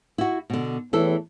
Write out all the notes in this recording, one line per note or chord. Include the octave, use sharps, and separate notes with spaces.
E4 F#4
B2 D3
E2 A2 E3 A4